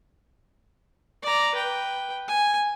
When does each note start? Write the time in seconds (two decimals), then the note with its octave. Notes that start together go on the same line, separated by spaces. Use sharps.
1.23 D5 A#5
1.55 B4 G5
2.28 G#5